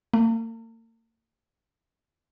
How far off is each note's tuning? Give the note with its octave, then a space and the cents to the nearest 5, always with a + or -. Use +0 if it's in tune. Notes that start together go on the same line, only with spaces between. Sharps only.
A#3 -45